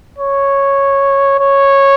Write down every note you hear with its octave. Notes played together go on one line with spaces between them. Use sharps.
C#5
C#5